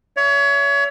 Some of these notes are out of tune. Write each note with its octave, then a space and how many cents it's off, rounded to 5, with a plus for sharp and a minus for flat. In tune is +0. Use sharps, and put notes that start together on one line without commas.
C#5 +30 E5 +20